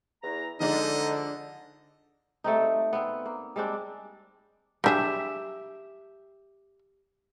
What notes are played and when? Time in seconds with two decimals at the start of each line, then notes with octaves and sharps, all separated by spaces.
0.23 E2 A#5
0.60 D3 F3 G#3 D4 D#4 D#5
2.44 G3 A3 C4 D#4
2.93 B3 C4
3.26 A#3
3.56 G3 G#3 C4 D4
4.84 F#3 D4 G4 G#4 E5